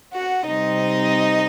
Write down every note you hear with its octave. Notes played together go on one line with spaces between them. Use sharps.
F#4 F#5
C3 G3 C4 D#4 D#5